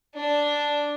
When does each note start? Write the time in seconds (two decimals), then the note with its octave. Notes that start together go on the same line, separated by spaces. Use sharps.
0.16 D4